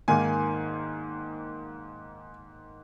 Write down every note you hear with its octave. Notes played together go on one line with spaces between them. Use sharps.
G#2 D#3 A#3 G#5